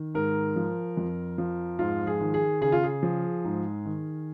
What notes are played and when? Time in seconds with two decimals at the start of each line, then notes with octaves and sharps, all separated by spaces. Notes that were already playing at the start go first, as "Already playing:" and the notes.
Already playing: D#3
0.15 G#2 A#4
0.56 F3
0.97 F2
1.38 F3
1.79 G#2 F4
2.07 G#4
2.21 D#3
2.34 G#4
2.61 C#3 G#4
2.72 F4
2.84 G#4
3.03 F3
3.45 G#2
3.86 D#3